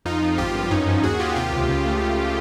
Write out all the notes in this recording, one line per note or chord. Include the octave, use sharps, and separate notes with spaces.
F2 D#4 F4
F3
G#1 F4 G4
G2
F#2 C#4 D#4
F3
D#2 F#4 G#4
D#2 F4 G4
C3 F4 G4
C#2
C#3
A3